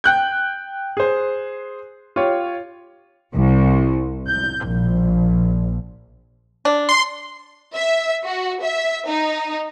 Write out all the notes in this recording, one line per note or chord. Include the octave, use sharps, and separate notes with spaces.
G5 F#6 G6
G#4 C5
F4 G4 C#5
C2
G6
A#1
D4
C6
E5
F#4
E5
D#4